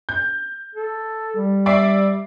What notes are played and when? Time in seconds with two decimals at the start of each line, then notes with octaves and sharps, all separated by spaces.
0.09 G6
0.75 A4
1.36 G3
1.66 D5 E5 C7